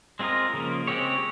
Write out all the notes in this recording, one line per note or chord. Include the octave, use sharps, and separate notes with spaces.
G#3 C4 F4 A#4 D#5
C#3 F3 A#3
G#3 C4 G4 C#5